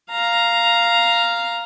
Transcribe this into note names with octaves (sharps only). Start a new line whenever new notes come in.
F5 A#5